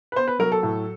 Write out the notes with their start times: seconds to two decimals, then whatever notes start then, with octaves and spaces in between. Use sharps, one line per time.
0.12 B4
0.16 B3 C5
0.28 B4
0.39 F#3 A#4
0.52 A4
0.63 A2